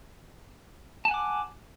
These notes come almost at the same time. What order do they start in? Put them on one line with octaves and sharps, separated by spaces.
A5 G#5 F#5 D6